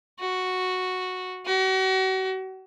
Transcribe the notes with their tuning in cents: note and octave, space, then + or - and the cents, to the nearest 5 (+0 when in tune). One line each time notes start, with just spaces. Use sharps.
F#4 -5
F#4 +40